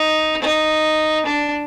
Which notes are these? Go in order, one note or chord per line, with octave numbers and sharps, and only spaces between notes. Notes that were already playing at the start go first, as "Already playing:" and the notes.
Already playing: D#4
D#4
D4